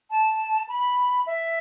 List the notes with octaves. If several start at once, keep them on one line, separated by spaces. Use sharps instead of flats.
A5
B5
E5